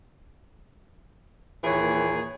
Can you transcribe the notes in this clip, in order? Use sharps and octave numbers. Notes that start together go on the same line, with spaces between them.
D#2 A#2 E3 G#4 C#5